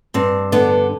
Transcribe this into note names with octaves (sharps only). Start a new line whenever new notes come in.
G2 C4
D3 B3